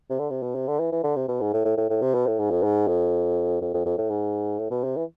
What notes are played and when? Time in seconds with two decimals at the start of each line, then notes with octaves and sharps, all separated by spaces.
0.10 C3
0.19 D3
0.30 C3
0.43 B2
0.55 C3
0.67 D3
0.80 E3
0.92 E3
1.04 D3
1.16 C3
1.28 B2
1.41 G#2
1.53 A2
1.65 A2
1.77 A2
1.90 A2
2.02 C3
2.14 B2
2.27 A2
2.39 G#2
2.51 F2
2.63 G#2
2.88 F2
3.61 F2
3.74 F2
3.86 F2
3.98 A2
4.10 G#2
4.59 A2
4.71 B2
4.84 C3
4.96 E3